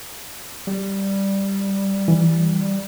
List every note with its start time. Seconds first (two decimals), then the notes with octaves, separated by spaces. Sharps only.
0.67 G3
2.08 E3